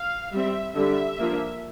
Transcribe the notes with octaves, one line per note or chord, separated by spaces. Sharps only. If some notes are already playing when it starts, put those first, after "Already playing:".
Already playing: F5
G3 C4 E5
D3 G3 D4 E5
F3 A#3 D4